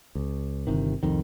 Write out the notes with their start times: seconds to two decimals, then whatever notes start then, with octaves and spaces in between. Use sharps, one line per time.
0.15 C#2
0.67 G1 C3 D#3
1.03 C2 F2 D#3